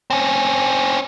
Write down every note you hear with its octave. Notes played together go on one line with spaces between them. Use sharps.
C4 C#4